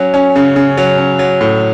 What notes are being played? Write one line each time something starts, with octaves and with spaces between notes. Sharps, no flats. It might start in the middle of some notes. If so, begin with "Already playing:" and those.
Already playing: F#3 C#4
C#4
C#3
C#3
F#3
C#4
F#3
A2